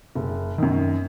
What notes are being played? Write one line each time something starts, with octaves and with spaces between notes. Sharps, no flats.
F#1
F#2 D#3